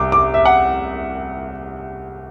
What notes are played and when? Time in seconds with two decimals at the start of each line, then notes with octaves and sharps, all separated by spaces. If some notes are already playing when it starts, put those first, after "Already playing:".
Already playing: C2 D6
0.12 D6
0.34 E5
0.45 F#5